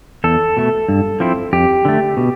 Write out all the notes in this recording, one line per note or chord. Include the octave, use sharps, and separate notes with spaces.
E2 A4
B2 A3
G2
F3 C4 E4
F2 G4
D3 A3
B2